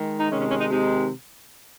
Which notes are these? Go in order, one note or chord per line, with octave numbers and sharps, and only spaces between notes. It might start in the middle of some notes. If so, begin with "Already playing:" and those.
Already playing: D#3 G#3
D#4
C3 D#3 G#3 C#4
C#4
C#4
D#4
C3 D#3 G#3 D#4